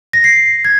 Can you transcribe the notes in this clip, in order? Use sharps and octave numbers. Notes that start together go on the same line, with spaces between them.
A#6
C7
G#6